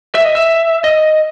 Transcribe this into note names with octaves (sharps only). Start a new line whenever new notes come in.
E5
D#5
E5
D#5